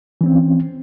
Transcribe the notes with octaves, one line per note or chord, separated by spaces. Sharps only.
E3 C4 C#4